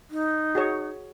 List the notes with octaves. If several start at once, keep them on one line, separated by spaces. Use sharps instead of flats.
D#4
F#4 G#4 C#5